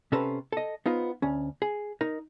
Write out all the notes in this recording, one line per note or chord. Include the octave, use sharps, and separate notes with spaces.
C3 C#4 A4 B4 C5 A#5
A4 D#5
B3 D#4 F4 C5
D2 C#4
G#4
D#4 A#4